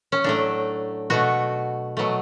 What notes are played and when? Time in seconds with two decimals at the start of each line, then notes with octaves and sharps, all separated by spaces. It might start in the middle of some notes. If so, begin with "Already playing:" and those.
0.12 C#4
0.24 A2 F#3 A3 D4
1.10 B2 A3 F#4
1.97 B2 F#3 A3